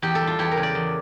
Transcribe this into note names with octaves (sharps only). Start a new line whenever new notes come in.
E2 G4
A4
G3
F4
E2 G4
A#4
C#3
D5
E2